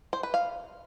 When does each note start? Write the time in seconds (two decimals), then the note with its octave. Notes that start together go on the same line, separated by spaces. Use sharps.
0.13 C5
0.23 B4
0.34 F5